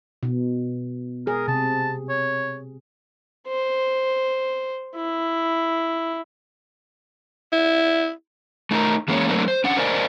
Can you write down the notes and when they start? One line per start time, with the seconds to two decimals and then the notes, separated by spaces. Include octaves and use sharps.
0.23 B2
1.27 G#4 A#4
1.48 C3 A5
2.09 C#5
3.48 C5
4.96 E4
7.52 E4
8.71 A3 D#4 A4 A#4
9.08 E3 G#3 A#3 C#4 C#5
9.29 F#3 A3 A#3 C4 D4
9.48 C5
9.64 C#4 D4 F#5
9.77 A#4 C5 D5 D#5 G#5